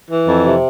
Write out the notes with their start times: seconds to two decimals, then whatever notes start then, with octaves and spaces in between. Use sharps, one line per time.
0.10 E3
0.28 F2
0.45 C3